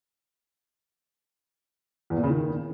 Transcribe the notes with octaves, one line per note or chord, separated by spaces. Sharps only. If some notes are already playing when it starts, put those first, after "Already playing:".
E2
A#2
C#3
D#3